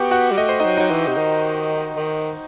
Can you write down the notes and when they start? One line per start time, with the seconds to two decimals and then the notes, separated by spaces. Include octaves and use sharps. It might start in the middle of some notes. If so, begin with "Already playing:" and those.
Already playing: B3 F#4 G4 G5
0.11 F#4 F#5
0.31 G3
0.38 A3 D#5
0.49 C5
0.60 F#3 D#4 D#5
0.77 F#3 D#4 D#5
0.90 E3
1.07 C3
1.17 D#3
1.96 D#3